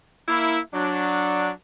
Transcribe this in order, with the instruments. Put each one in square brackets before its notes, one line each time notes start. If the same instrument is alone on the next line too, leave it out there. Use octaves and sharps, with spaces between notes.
[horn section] A#3 E4
F#3 D4